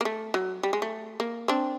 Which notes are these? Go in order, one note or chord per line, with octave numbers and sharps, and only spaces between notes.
A#3
A3
F#3
G3
G#3
A3
A#3
C4 D4